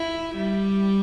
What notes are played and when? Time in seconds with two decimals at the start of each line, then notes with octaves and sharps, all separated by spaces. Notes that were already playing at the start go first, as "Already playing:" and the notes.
Already playing: E4
0.36 G3